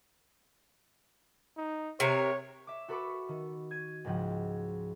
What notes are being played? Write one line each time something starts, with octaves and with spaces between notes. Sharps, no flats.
D#4
C3 A#4 C#5
E5 D6
F#4 A4 B4 B5 C#6 D6
D#3
G#6 D#7
C#2 G#2 F3 F#5 G5